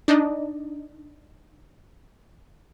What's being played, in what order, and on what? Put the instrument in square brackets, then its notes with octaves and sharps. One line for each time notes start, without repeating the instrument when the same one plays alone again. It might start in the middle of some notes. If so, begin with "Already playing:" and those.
[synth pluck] D4 D#4 D5 D#5